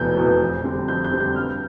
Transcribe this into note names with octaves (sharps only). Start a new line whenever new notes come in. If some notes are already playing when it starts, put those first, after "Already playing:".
Already playing: F1 E2 B2 B3 G6
E2 B2 B3
F2
D3 G3 C4
F2 G6
G6
D3 G3 C4
G6
G2 F6